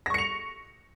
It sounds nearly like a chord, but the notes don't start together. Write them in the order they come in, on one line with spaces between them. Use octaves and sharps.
A#6 C#6 C#7 F7